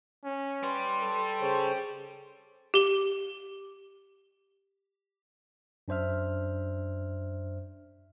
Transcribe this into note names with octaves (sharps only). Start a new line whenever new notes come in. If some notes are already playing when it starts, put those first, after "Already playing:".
C#4
G4 B4 D5 C6
A4
C#3 C5 C#5
G4 G7
F#2 D4 C5 E5 F6